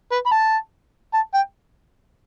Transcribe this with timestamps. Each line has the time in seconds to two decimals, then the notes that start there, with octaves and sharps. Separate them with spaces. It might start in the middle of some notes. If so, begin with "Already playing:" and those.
0.12 B4
0.26 B5
0.32 A5
1.14 A5
1.34 G5